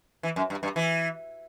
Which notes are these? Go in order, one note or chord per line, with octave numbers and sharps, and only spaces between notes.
E3
F#2
G2
G2
E3